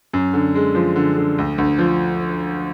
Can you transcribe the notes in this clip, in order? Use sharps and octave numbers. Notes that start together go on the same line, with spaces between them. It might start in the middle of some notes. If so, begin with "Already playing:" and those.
F#2
D3
G#3
F3
D3
D3
D2
D2
F3